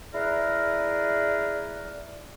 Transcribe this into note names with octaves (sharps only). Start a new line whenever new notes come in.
E4 G#4 A#4 B4 D5